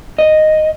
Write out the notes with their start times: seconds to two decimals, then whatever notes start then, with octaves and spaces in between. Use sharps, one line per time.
0.19 D#5